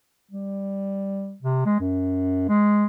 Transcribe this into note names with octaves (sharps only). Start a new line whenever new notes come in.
G3
C3
G#3
F#2
G#3